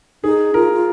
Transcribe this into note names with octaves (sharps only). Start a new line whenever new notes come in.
D#4 G#4
F4 A#4
F4